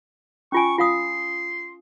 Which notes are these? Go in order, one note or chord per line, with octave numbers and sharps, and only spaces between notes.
C#4 F4 G#5 C#6
F4 F5 C6 D#6